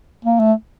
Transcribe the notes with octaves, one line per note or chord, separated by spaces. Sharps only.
A#3
A3